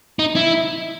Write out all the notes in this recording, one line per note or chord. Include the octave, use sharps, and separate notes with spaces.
D#4
E4